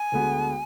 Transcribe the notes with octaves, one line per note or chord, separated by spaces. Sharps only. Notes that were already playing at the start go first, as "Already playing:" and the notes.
Already playing: G#5
D2 D3 G#3 B3 F#4